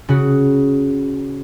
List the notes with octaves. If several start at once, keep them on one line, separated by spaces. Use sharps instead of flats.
C#3 F#4